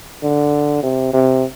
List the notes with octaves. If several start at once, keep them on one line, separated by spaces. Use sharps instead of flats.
D3
C3
C3